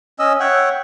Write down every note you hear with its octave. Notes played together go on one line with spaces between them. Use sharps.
C#4 D#5 E6
C#5 E5 F#5 G5